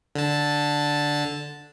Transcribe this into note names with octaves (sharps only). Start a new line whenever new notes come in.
D3 A5